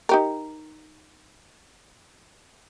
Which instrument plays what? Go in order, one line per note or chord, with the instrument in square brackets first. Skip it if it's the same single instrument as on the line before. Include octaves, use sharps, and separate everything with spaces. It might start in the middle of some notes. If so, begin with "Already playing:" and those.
[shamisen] D#4 G4 A#4